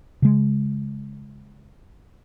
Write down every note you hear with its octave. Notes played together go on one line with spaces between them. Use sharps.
C#3 G#3